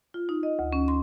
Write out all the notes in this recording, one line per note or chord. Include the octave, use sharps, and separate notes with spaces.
F4
D#4
D#5
D2
C#4
C6